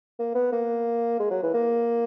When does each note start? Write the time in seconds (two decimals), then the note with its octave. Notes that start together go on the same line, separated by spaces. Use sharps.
0.19 A#3
0.35 B3
0.52 A#3
1.20 G#3
1.31 F#3
1.43 E3
1.54 A#3